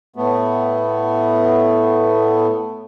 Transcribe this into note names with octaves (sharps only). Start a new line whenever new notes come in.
A2 A3 B3